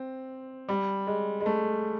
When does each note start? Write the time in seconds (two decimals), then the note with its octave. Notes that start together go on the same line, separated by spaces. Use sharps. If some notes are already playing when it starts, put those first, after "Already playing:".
Already playing: C4
0.69 G3
1.07 G#3
1.41 G#3
1.46 A3